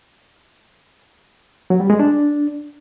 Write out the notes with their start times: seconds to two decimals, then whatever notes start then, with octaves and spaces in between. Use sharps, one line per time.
1.70 F#3
1.80 G3
1.90 G#3
1.99 D4